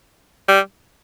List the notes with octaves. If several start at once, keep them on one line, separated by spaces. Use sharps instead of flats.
G3